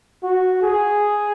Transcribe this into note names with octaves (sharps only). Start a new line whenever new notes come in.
F#4
G#4